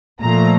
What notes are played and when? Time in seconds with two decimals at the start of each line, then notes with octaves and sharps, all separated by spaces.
0.20 A#2 F3 A3 A#5